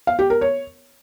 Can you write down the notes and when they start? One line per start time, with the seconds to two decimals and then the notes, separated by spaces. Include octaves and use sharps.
0.07 F5
0.19 G4
0.30 A#4
0.41 C#5